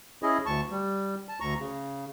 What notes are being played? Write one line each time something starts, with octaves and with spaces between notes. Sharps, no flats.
C#4 E4 G#4 D#5
D2 A5 C#6
G3
A5
D2 A#5 C#6
C#3